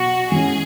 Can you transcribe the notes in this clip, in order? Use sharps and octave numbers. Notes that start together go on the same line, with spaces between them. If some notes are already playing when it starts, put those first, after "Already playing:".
Already playing: B2 F#3 F#4
E3 G#3 C#4 G#4